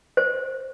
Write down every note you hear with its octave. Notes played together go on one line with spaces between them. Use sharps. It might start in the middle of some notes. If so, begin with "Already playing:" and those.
C5